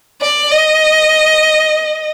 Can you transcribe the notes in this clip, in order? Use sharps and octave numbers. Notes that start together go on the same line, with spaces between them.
D5
D#5